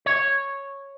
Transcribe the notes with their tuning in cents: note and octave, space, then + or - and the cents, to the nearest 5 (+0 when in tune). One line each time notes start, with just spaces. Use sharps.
C#5 -5